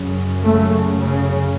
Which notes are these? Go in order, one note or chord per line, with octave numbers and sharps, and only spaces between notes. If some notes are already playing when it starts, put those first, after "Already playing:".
Already playing: F#2 C#3
A3
C#3